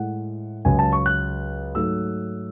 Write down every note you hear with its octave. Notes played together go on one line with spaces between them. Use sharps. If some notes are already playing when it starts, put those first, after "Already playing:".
Already playing: A2 G#3 F#5
C#2 C#3 F#3 G#5
A5
C#6
F#6
G#2 F#3 A3 E6